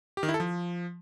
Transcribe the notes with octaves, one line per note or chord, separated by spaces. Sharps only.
G4
D#3
E4
A4
F3